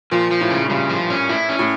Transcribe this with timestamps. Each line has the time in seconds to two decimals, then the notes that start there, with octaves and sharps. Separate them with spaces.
0.11 A#2 F3
0.31 F3
0.41 A2
0.50 C#3
0.65 A2
0.70 G2 C#3
0.89 F3
1.10 C#4
1.29 A2 E4
1.49 C#4
1.59 A2